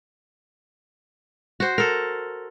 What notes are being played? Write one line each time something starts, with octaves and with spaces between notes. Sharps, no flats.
F#4 C5
A4 A#4